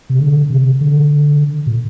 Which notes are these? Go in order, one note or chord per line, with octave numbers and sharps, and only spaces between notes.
C3
D3
C3
D3
A#2